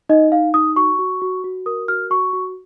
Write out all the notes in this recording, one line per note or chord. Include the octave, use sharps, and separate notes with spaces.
D#4 D#5
D#4 F5
D#4 D#6
F#4 C#6
F#4
F#4
F#4
A#4 D#6
F#4 F6
F#4 C#6
F#4